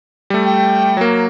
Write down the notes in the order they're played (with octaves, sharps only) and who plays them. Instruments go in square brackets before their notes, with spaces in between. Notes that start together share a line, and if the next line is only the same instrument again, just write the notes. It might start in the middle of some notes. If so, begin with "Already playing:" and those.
[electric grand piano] G3 A3
[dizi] G5
[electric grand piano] F#3 A#3